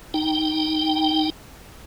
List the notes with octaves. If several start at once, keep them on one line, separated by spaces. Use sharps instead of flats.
D#4 G5